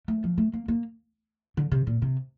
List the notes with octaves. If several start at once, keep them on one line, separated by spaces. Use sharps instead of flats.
A3
F3
A3
A#3
A#3
D3
C3
A#2
C3